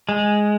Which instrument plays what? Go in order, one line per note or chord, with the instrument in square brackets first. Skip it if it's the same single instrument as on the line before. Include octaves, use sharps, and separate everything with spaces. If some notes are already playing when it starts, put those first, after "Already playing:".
[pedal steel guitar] G#3